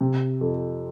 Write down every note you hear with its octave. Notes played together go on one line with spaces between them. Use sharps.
C3
F2